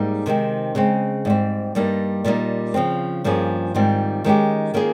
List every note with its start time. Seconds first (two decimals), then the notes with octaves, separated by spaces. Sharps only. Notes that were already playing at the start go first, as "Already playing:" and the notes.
Already playing: G#2 G3 A#3 D#4 G#4
0.26 C3 D#3 G#3 C4
0.75 C#3 G#3 C4
1.25 G#2 G3 C4
1.75 G2 G3 A#3 D#4
2.25 A#2 G3 A#3 D#4
2.74 C#3 F3 C4
3.24 G2 F3 A#3 C#4 G#4
3.74 G#2 D#3 G3 C4 F4
4.24 D#3 G#3 C#4 G4
4.74 D#3 A#3 C#4 F4 G#4